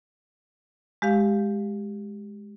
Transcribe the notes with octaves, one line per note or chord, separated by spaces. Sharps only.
G#3 G4 F5